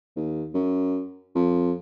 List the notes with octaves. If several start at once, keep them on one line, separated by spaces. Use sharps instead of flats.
D#2
F#2
F2